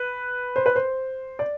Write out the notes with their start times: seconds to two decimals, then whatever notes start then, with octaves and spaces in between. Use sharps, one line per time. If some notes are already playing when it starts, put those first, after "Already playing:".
Already playing: B4
0.56 C5
0.66 B4
0.76 C5
1.39 D5